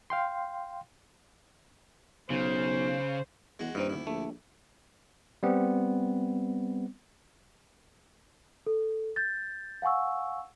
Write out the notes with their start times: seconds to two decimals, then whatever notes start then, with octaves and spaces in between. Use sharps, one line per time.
0.10 F5 G5 C6
2.30 B1 C#3 C5
3.59 E2 G#3 F#4
3.75 D#1 G2 C4 D#4 E4
3.89 D2 E4
4.07 A#1 A3
5.43 G3 B3 C4
8.67 A4
9.16 G6 A6
9.82 F5 F#5 G#5 C#6 E6